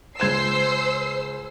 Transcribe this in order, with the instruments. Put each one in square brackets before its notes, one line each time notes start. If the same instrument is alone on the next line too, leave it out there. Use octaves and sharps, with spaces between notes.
[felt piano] C#2 G#6 E7 [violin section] C5 E6 C7